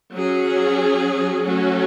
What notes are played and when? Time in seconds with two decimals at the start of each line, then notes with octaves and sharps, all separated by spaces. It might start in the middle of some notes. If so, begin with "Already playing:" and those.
0.15 F#3 C#4 G#4
1.46 F#3 A3 C#4 F#4